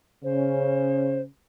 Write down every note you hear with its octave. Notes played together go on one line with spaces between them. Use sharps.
C#3 C#4 C5